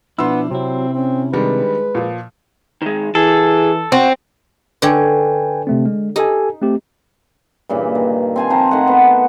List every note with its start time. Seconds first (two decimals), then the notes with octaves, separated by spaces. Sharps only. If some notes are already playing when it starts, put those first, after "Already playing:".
0.19 B2 F3 B3 D4 E4 C6 E6
0.51 C3 F#3 C4 E4
0.94 C4 C#4
1.33 D#3 G3 G#3 D4 B4
1.95 A#2 F3
2.82 D#3 G#3
3.15 E3 G#4 A4
3.92 C4 F#4
4.82 D3 B4 C#5 G5 G#5
5.67 C3 A3 C4
5.86 G#3
6.16 D#4 G4 A4 G#5
6.62 A3 C4 G4
7.69 G2 A#2 C#3 E3
7.95 D#3
8.36 C4 G#5 A5
8.50 F3 C4 C5 A#5
8.71 D#3 A3 F#5
8.87 B3 A4 C5